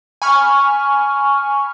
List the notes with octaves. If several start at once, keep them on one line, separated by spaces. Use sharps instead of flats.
G#5 B5 C#6 F6